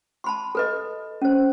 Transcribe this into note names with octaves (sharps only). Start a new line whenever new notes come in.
A5 B5 C6
A4 B4 D#5
C#4 C5